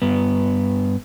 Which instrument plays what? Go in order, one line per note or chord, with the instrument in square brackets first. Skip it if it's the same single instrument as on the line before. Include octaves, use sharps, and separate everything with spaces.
[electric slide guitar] G2 B3